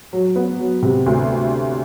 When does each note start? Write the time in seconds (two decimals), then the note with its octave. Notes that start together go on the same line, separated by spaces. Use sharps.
0.13 F#3
0.36 B3
0.59 F#3
0.83 C3
1.06 D2